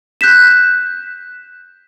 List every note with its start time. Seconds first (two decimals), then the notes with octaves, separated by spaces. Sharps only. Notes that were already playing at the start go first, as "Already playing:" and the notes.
0.21 F#6 G6 B6 E7